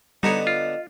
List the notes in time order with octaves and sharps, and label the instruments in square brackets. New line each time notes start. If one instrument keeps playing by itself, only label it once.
[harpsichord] D3 B3 [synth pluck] G3 A#5 [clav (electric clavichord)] D#4 C#5 [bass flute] D#5
[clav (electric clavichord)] F4